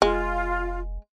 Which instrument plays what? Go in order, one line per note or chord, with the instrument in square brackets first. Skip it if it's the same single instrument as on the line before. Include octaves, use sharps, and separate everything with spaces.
[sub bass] F1 [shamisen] G#3 [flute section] F4